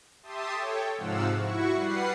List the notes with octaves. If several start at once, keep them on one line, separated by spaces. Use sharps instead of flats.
G4 E5 A5 C6 D#6
A4 C#5 G5
G#2 C3 F3 F5 F#5 E6
E4 F#4 C#6
G3 B4 F#5 C7